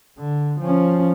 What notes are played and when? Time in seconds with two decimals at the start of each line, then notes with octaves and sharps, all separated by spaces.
0.19 D3
0.60 F3 C#4